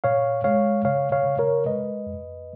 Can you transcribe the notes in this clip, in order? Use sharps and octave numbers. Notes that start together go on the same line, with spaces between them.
A#2 C#5 F5
G#3 C#5 F5
C#3 C#5 F5
C#5 F5
C#3
A#4 C#5
G#3 B4 D#5
F2